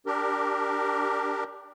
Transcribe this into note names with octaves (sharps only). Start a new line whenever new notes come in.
D4 G4 A#4